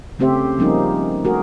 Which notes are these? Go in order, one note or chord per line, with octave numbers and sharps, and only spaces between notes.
C#3 A3 C4 G4 C5 E5
F3 G3 A#3 C#4 D#4 G#4
A3 F#4 G#4 A#4